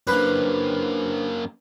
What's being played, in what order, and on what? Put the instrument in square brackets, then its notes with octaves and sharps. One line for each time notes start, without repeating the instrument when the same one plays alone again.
[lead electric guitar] F#2 A#3 [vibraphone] D4 C5 [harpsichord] B4